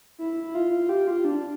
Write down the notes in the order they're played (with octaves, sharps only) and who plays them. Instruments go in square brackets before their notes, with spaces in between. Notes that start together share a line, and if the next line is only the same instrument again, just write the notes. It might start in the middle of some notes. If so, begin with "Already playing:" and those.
[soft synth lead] E4
F4
G4
F4
D4